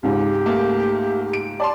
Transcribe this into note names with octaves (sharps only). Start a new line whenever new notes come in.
C#2 G#2 G4
A3 A#3
D7
D5 A5 C6